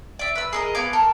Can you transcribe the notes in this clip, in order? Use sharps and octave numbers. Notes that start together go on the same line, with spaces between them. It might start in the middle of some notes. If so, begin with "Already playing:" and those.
D5 E5
B4 E6
G#4 A#4 D#5
B3 F5 G#5 D6
A4 A#4